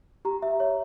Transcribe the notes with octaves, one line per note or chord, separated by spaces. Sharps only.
G4 A#5
E5
C#5